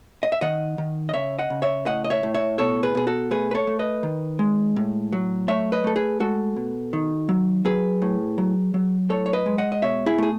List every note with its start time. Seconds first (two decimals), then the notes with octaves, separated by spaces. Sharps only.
0.23 D#5
0.32 E5
0.41 D#3 D#5 F#5
0.78 D#3
1.09 D#5
1.13 C#3 C#5 E5
1.39 D#5 F#5
1.50 C#3
1.62 C#5 E5
1.86 A2 D#5 F#5
2.04 D#5
2.10 C#5 E5
2.23 A2
2.34 C#5 E5
2.58 B2 A4 C#5
2.83 G#4 B4
2.95 B2 G#4
3.07 F#4 A4
3.31 A3 G#4 B4
3.51 B4
3.55 A4 C#5
3.67 A3
3.79 B4 D#5
4.03 D#3
4.39 G#3
4.76 A2
5.13 F#3
5.48 A3 C#5 E5
5.72 B4 D#5
5.84 A3 A4
5.96 G#4 B4
6.20 G#3 F#4 A4
6.56 B2
6.93 D#3
7.29 F#3
7.65 F#3 G#4 B4
8.02 A2
8.38 F#3
8.74 F#3
9.09 A2 A4 C#5
9.26 C#5
9.33 B4 D#5
9.46 G#3
9.58 D#5 F#5
9.72 D#5
9.82 B2 C#5 E5
10.06 E4 G#4
10.18 A3 G#4